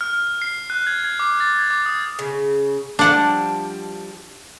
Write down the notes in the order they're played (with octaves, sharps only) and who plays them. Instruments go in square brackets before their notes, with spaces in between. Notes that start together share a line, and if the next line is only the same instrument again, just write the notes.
[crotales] F6
F6
C7
F#6
G#6
G#6
D6
A6
G#6
D6
D#6
[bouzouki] C#3
[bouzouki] F3 G3 A5 [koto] D4 F#5